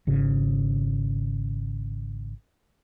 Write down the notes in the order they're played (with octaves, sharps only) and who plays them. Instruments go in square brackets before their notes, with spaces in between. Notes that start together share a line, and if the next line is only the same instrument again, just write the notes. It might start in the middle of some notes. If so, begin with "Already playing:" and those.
[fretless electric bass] G#1 C#3